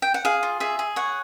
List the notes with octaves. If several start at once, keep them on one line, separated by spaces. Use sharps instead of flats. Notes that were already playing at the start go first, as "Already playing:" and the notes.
G5
F#5
G#4 F5
F4
G#4 E5
G#4
C#5 F#5